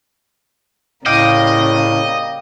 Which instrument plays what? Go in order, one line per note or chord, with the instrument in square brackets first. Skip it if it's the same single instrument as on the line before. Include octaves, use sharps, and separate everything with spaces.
[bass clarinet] A2 [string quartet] C#3 G3 A#3 [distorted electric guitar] D#5 [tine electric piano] F5 G5 D6